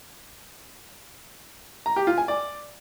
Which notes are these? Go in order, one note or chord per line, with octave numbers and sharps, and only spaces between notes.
A#5
G4
F4
G#5
D5